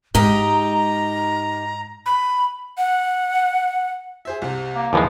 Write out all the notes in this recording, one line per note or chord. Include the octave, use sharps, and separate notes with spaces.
G#2 G#3 D#4 G4 A#5
B5
F#5
G#4 C5 E5
C2 C3
A#3
D#2 E3 F3 G#3 E4 A#5